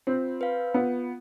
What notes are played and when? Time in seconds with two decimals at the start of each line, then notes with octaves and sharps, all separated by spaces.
0.07 C4 F4
0.41 B4 F5
0.74 B3 F4